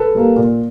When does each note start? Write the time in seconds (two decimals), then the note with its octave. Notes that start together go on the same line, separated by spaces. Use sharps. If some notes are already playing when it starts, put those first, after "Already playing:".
Already playing: A4 B4
0.15 G3 A#3
0.36 A#2